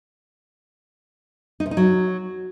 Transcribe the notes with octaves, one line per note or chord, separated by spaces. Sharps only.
D#4
C3
D#4
F#3